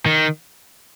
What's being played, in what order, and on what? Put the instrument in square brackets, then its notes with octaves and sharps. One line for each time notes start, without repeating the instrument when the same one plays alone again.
[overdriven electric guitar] D#3